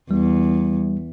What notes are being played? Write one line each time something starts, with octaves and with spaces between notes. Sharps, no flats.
E2 G3